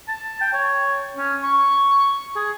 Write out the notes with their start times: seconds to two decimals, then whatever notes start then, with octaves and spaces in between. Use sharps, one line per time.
0.08 A5
0.41 G5
0.53 C#5
1.16 C#4
1.43 C#6
2.36 G#4